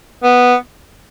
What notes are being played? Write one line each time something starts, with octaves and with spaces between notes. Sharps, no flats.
B3